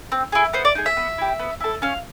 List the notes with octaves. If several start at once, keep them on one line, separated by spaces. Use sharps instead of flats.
C4
E4 G#4
B3 C5
D5
D#4 G#4
E5
B3
E4 G4
B3
E4 A4
C#4 F5